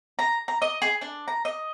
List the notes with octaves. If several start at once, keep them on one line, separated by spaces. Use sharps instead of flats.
A#5
A#5
D#5
G#4
D4
A#5
D#5